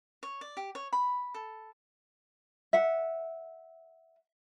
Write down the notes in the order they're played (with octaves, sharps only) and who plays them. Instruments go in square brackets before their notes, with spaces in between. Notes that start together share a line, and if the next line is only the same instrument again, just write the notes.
[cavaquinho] C#5
D5
G4
C#5
B5
A4
[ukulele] E5 F#5